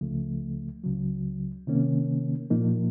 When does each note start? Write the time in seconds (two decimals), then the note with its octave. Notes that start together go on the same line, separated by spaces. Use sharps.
0.01 C#2 C#3 F3 A3
0.84 C#2 C#3 F#3
1.67 C3 D#3 A#3 C#4
2.51 A#2 F3 A#3 D#4